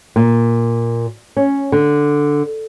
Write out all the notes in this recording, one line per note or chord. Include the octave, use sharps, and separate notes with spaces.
A#2
C#4
D3